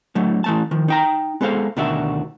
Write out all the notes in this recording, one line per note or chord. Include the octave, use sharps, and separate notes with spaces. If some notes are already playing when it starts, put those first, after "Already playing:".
D3 F#3 A3
E3 A3 A5
D#3 F3
D#4 G5 A#5
G#3 B3 A4 C5 F5
D2 B2 D#3 D4 F#4 E5